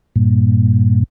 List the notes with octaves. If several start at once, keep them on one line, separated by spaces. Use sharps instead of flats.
G2 A#2